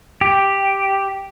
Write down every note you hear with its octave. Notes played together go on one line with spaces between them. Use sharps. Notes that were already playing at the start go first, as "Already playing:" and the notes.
G4